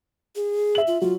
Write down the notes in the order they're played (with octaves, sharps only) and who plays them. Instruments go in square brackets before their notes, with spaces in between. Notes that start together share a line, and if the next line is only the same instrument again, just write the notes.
[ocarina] G#4
[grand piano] E5 F#7
[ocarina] F4
[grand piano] F#3 [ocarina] F4